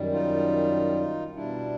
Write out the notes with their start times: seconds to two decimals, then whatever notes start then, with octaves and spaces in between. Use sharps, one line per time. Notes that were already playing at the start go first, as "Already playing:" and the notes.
Already playing: F#2 D#3 G3
0.13 D#4 F4
1.35 B2 G3 D4 E4